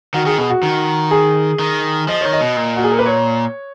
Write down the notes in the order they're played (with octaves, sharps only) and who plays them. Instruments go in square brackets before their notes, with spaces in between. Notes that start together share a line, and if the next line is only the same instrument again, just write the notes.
[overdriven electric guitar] D#3 [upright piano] F#4
[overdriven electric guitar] D#3 [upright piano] G#4
[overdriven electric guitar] B2 [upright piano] G#4
[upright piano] F#4
[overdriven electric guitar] D#3
[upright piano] G#4
[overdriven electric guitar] D#3
[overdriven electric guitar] F3 [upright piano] D#5
[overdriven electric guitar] D#3 [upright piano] C#5
[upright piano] D#5
[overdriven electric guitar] B2
A#2
[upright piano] F#4
G#4
A#4
B4
C#5